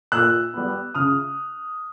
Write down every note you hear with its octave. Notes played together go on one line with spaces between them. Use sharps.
A#2 E6 F#6
G3 B3
C#3 D#6 F6